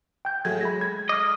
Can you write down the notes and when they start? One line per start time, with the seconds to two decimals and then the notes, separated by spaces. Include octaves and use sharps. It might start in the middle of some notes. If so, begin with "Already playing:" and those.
0.25 G5 G6
0.45 F#3 A3 G#4 G#6
0.61 G#3 B5 A#6
0.81 G#6
1.09 D#5 D6 F6